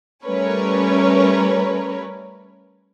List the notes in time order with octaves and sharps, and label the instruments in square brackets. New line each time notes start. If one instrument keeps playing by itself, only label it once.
[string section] G3 A3 C#4 A#4 B4 C#5